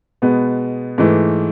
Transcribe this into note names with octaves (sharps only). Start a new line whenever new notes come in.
B2 G#3 B3
G#2 E3 A3